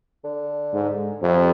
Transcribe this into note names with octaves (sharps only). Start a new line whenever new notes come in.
D3
G#2
F2 C3